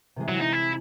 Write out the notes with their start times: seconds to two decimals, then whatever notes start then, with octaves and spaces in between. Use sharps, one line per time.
0.16 C3 E3 G#3
0.29 F#3
0.40 D#4
0.53 E4